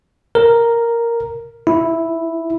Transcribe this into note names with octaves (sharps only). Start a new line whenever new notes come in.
A#4
E4